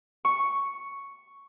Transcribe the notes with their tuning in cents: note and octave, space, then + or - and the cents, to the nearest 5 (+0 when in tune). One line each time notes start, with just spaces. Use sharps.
C#6 +0